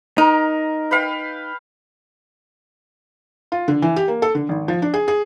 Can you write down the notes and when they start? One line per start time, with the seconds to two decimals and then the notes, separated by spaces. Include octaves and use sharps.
0.18 D#4 A#4
0.91 B4 F5 G5
3.52 F4
3.68 D3
3.82 E3
3.96 G4
4.08 A#3
4.22 A4
4.35 D3
4.49 G#1
4.68 F3
4.82 D4
4.94 G#4
5.08 G#4